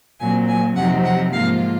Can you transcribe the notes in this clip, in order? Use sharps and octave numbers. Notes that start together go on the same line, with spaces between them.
A#2 F#3 C4 G#5
G#5
F2 C3 F#3 C4 D#4 F#5
F#5
G#2 F3 A#3 F4 F5